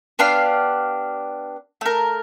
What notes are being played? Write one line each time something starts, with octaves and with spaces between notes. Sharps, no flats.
B3 D4 G4 F5
A3 A#4